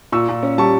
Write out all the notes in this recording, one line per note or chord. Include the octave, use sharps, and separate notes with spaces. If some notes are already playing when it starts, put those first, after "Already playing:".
A#2 C#6 E6
A#2
C#4
G3 A5 C#6